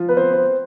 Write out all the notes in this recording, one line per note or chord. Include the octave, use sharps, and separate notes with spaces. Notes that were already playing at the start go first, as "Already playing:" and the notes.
Already playing: F3 F4
B3 B4
C4 C5
C4 C5